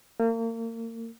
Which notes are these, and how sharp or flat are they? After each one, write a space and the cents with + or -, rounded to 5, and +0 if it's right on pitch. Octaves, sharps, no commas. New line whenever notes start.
A#3 -35